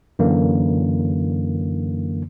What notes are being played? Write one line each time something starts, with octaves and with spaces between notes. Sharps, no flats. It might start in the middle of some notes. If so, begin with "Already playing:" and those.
F#2 D3 E3 A#3